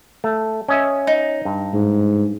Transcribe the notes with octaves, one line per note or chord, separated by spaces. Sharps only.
A3
C#4 D#5 E5
D#4
G2
G#2